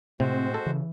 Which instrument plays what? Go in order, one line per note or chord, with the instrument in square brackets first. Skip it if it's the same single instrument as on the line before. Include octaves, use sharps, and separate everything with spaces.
[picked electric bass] A2 [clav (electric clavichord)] C3 [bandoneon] G#3 F#4 C5 [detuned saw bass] C4
[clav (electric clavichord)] A4
[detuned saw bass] C#3 [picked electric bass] E3